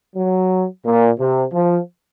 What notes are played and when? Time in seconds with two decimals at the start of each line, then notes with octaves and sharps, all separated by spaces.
0.16 F#3
0.85 A#2
1.19 C3
1.53 F3